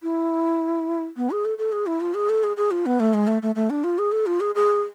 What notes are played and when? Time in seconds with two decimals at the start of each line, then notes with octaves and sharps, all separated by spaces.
0.03 E4
1.17 B3
1.31 G#4
1.45 A4
1.58 A4
1.72 G#4
1.86 E4
2.01 F4
2.14 G#4
2.29 A4
2.43 G#4
2.57 G#4
2.71 F4
2.86 B3
3.00 A3
3.14 G#3
3.27 A3
3.42 A3
3.55 A3
3.70 D4
3.84 F4
3.98 G#4
4.12 A4
4.26 F4
4.40 G#4
4.55 G#4